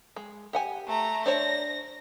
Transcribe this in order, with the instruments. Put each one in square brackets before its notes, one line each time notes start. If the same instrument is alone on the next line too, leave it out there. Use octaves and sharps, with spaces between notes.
[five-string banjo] G#3
G4 F#5 G#5
[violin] A3 A#5
[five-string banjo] D4 C5 C#5 [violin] A#6